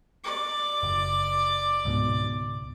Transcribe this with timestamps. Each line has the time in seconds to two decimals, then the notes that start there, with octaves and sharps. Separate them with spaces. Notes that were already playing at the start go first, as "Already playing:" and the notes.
0.24 D5 D6
0.83 F#1
1.85 C#2 G#2 B2